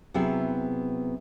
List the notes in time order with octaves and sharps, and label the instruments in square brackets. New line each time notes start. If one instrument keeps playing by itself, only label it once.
[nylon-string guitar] C3 F#3 B3 E4 G#4 E5